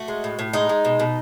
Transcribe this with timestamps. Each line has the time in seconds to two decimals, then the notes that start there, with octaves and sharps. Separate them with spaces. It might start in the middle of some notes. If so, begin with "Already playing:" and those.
Already playing: A3 F#4
0.08 G#3
0.24 A2
0.39 A2
0.53 G#3 D#4
0.69 G#3
0.85 B2
0.99 B2